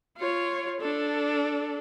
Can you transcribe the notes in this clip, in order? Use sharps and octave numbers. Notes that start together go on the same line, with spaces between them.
F4 C#5
D4 A4